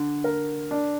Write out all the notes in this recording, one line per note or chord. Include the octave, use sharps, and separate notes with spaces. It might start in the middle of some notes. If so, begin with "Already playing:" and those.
Already playing: D3
A#4
D4